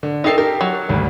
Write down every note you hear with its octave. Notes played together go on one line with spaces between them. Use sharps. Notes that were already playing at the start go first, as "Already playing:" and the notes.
D3
D#4 A4 A#4 E5 G5 C7
G4 A4 A#4
F#3
G#1 D2 G3